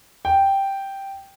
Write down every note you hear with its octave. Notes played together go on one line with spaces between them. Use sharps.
G5